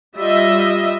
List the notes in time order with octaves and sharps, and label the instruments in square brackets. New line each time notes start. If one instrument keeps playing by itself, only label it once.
[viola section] G3 F4 D#5 E5